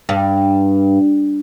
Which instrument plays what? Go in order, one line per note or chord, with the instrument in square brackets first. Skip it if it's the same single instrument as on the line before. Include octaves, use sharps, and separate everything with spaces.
[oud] G2